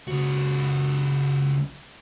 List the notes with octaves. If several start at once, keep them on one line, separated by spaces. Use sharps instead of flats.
C#2 F#4